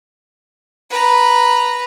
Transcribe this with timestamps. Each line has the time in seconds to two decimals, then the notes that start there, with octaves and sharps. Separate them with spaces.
0.90 B4 A#5